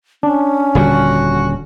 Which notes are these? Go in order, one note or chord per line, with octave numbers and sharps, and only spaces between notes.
C#4 D4
D#1 D3 G3 F#4